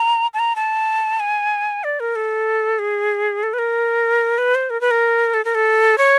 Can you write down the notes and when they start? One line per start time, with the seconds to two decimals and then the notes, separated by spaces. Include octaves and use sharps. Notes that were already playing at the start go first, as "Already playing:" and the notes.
Already playing: A#5
0.34 A5
0.39 A#5
0.56 A5
1.20 G#5
1.84 D5
2.00 A#4
2.16 A4
2.79 G#4
3.43 A4
3.54 B4
3.59 A#4
4.38 B4
4.55 C5
4.70 A#4
4.81 B4
4.91 A#4
5.34 A4
5.45 A#4
5.55 A4
5.98 C#5